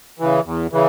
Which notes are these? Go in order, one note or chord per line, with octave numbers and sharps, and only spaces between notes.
C#3 E3
E2
C#3 E3